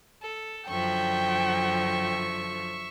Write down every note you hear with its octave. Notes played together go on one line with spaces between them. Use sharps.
A4
F#2 D3 F3 E5 G5 C#6